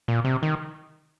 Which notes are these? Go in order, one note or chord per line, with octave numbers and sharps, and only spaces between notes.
A#2
C3
D#3